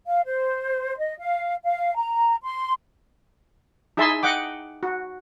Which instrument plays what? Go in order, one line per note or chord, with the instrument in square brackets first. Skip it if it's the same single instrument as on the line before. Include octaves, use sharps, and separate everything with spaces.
[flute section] F5
C5
D#5
F5
F5
A#5
C6
[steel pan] D#4 E4 G#4 E5 A5 C6
D#5 F#5 G5 D6
F#4